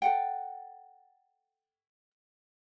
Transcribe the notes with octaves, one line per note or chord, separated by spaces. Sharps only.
A4 F#5 G5